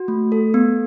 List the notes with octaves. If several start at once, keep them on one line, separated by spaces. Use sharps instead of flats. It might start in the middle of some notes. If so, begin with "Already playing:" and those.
Already playing: F#4
A3
A4
B3